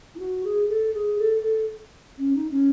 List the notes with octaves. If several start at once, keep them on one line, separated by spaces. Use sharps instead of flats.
E4
F#4
G#4
A4
G#4
A4
A4
C#4
D#4
C#4